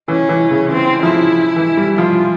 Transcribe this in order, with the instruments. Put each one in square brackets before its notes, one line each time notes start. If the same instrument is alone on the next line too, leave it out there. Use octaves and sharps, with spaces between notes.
[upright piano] E3 [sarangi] C#4
[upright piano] E3
C#3
[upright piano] E3 [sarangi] C4
[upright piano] F3 [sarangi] E4
[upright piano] E3
G3
[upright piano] F3 [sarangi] F4